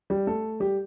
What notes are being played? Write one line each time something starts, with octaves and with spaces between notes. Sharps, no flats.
G3 G4
A3 A4
G3 G4